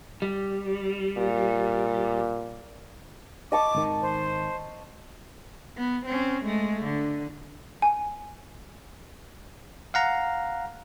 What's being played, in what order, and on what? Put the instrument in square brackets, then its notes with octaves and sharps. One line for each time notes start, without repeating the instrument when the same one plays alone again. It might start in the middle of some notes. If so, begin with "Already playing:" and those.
[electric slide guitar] G3
[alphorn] A#2
[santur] D#5 A5 C#6 [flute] D6
[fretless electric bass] G#1 D#3
[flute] C5
[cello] B3
C4 C#4
G#3 A3
D3
[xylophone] G#5
[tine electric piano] F5 F#5 A#5